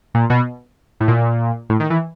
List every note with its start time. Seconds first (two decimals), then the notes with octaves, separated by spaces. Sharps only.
0.14 A#2
0.30 B2
1.00 A2
1.08 A#2
1.69 A2
1.80 D#3
1.90 E3